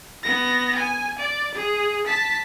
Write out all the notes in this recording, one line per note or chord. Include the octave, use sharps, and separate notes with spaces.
B3 A#6
G#5
D5
G#4
A5 B6